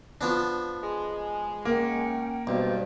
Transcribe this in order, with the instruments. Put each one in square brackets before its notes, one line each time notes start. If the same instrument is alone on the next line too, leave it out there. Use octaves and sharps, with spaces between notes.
[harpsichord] F3 B3 D4
[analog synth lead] G#3
[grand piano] A#3 [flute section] C#4 F#5 G5
[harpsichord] B1 [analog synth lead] G2 [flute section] C5 D5